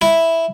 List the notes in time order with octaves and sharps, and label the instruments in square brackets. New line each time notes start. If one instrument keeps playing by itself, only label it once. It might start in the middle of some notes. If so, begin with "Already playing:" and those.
[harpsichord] E4